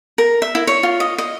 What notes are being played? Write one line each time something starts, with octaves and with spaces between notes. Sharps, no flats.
A#4
E5
E4
C#5
F4
D#5
D#5